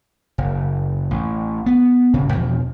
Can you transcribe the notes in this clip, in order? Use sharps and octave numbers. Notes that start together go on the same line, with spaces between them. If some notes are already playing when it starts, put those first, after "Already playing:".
F#1
A1
B3
D#1 G#1 C#3
E2 B2 F3